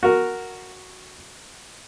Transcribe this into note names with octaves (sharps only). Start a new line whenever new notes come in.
F#4 A#4